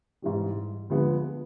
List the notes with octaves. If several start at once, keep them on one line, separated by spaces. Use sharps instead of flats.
G#2 E3 G3
D2 D3 F3 G#3 B3